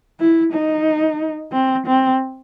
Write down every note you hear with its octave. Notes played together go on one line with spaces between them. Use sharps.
E4
D#4
C4
C4